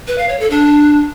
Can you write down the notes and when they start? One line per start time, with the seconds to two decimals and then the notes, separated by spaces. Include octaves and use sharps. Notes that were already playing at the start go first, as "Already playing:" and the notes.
0.07 B4
0.18 F5
0.29 C#5
0.40 A4
0.50 D4